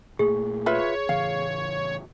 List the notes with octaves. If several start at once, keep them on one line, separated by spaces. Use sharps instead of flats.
A#2 A3 A#3 G#4
F4 B4 C#5 E5
A2 C#3 E3 F5